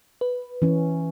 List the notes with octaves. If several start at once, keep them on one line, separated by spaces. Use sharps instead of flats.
B4
E3 C#4